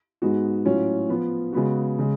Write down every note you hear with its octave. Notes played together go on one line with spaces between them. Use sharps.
G#2 G#3 B3 F#4
A2 F#3 C#4 F4
F3 B3 F4
C#3 G#3 B3 F#4
C#3 G#3